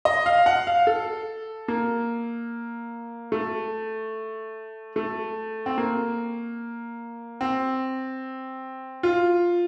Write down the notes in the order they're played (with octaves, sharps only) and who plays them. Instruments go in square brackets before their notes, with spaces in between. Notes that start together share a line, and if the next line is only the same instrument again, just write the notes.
[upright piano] D#5
F5
F#5
F5
A4
A#3
A3
A3
C4
A#3
C4
F4